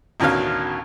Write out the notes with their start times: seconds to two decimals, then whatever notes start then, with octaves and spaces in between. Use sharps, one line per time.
0.20 A1 D2 B2 D#3 C#4 F5